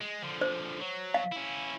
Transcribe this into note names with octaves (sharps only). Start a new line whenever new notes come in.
G#3
D3 F3
C5
F#3
F5
C#4 E4